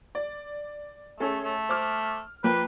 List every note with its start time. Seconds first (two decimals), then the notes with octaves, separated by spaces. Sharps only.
0.15 D5
1.20 A3 C#4 G#4 A4
1.44 A3
1.69 C5 D6 F6
2.44 F3 A#3 B4 G5